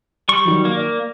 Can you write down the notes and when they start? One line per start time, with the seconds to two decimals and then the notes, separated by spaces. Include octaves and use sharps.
0.29 G3 C#6
0.45 D#3 F#3
0.65 A#3
0.76 D5